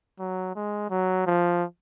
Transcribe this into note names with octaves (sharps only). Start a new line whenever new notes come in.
F#3
G#3
F#3
F3